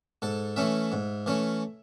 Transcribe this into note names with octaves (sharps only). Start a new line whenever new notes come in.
G#2 A4
E3 A3 C#4 E5
G#2
E3 A3 C#4